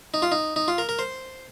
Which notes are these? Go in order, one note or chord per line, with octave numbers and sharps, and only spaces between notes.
D#4
F4
D#4
D#4
F4
A#4
A#4
C5